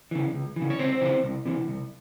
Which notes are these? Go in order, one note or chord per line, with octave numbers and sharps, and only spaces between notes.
C#3 E3
C#2
C#3 E3
C#5
C#2 C4 C5
C#3 E3
C2
C3 E3
C2